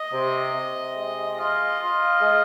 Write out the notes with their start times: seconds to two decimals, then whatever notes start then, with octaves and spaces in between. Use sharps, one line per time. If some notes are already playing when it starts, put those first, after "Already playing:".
Already playing: D#5
0.12 C3
0.54 C3
0.95 G#3
1.37 F4 D#5
1.79 F4
2.21 G#3